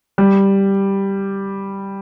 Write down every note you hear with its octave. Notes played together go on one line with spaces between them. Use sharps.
G3